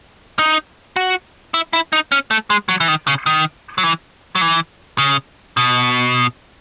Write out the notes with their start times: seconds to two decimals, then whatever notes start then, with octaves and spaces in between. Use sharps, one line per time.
0.39 D#4
0.96 F#4
1.54 E4
1.73 E4
1.93 D#4
2.12 C#4
2.31 A3
2.50 G#3
2.69 F#3
2.80 E3
2.88 D#3
3.07 C#3
3.26 D#3
3.78 F#3
3.83 E3
4.35 F#3
4.41 E3
4.98 C#3
5.57 B2